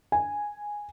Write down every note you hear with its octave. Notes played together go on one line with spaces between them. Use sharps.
G#5